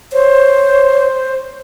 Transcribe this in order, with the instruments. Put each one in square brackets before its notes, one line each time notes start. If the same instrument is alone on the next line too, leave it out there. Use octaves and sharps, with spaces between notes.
[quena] C5 [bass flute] C#5